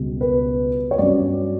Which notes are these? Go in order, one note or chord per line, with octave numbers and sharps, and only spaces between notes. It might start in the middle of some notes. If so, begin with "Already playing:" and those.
Already playing: C#2 B2 G3
B4
C#5
G2 F#3 C#4 D5